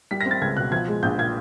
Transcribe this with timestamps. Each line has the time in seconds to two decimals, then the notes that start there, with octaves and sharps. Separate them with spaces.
0.11 G3 B6
0.21 A#6
0.25 C4
0.31 A6
0.42 C#2 G#6
0.57 B2 F#6
0.72 F3 G#6
0.88 G#3
1.03 A#1 G6
1.18 A#2 G#6